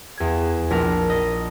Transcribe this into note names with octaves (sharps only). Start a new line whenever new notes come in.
E2 G#6
A#1 A#4
D#5